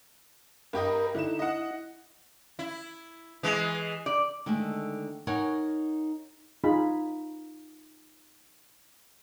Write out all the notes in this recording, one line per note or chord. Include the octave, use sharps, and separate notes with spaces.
G2 G4 A#4 D#5
D3 D#4 E4 E7
D#5 F#5
E4
E3 G#3
D5
D3 D#3 G#3 A3
D#4 A#4 C#5 F#5 G#5
D#4 F4 G#4 B5